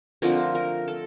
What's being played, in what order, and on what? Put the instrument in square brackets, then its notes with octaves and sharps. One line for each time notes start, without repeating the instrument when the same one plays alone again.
[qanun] D3 F3 A3 C4 A#4
A#4
A4